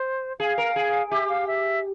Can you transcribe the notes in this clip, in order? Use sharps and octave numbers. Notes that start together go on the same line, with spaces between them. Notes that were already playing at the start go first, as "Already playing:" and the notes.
Already playing: C5
G#4 F5
A#4
G#4
G4 E5
F5
E5